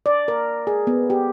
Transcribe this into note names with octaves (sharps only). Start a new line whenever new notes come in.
D5
A#4
G#4
B3
G4